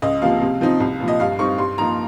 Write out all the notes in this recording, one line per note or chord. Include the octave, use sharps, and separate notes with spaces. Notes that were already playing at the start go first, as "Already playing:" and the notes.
C#2 D#5
C3 F3 A#3 F5
C3
F3 C4 D#4
C2
A#2 F3
D#5
G2 F5
G3 C4 D#4 C#6
G2 C6
F3 A#3 D#4 A#5